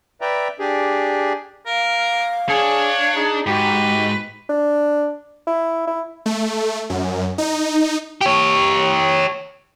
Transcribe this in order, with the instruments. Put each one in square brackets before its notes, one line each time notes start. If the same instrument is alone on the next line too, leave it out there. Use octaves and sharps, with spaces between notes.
[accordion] B4 D5 E5 G5 A#5
D4 G4 G#4
[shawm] A#4 [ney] F5
[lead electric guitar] D4 [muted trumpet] G#4 [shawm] C#5
[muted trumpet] D#4 [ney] G#4
[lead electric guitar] G#2 [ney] F#4 [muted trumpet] G4 [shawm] B4
[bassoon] D4
E4
E4
[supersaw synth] A3
F#2
D#4
[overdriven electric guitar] G4 C#5